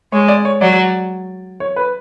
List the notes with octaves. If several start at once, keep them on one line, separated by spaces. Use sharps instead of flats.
G#3 C#5
D5
C#5
F#3 D5
C#5
B4